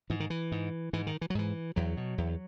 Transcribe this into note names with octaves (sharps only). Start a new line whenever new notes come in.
G#2 E3
D#3
E3
G#2
G#2 E3
D#3
E3
F#3
G#2 E3
E2 F#3
B2
E2